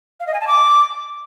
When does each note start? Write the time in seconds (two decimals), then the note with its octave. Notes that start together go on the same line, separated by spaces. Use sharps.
0.20 F5
0.27 D#5
0.34 G#5
0.41 A5
0.47 D6